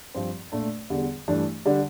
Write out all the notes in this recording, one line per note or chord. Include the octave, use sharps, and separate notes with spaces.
G2 F3 C4
A#2 A3 D4
E2 D3 G3
G2 E3 A3 D4
D3 G3 D4